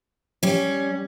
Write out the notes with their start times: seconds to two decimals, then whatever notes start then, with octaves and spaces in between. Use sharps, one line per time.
0.43 G3 C#4